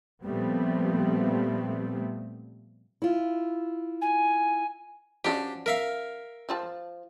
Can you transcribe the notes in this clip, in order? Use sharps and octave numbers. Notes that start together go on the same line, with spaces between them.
A#2 F3 G3 A3 B3 C4
E4 F4
G#5
F3 C#4 D4 F#4 G4
A#4 E5 F5
F3 F4 A5